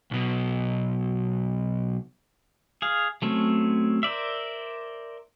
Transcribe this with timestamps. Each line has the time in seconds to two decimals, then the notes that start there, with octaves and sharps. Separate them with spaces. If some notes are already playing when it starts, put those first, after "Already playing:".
0.11 B1 B2
2.82 G#4 F5
3.22 F#3 A3 C4 C#4
4.03 A#4 C5 D5 E5